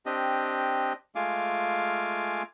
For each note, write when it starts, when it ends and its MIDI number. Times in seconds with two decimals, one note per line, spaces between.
0.06 0.93 60
0.06 0.93 62
0.06 0.93 67
0.06 0.93 75
1.15 2.43 56
1.15 2.43 57
1.15 2.43 65
1.15 2.43 77
1.15 2.43 80
1.15 2.43 86